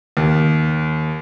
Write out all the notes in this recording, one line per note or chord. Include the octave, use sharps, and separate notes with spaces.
D#2